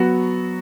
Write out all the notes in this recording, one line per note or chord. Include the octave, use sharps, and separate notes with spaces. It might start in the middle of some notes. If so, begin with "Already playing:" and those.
Already playing: F#3 B3 F#4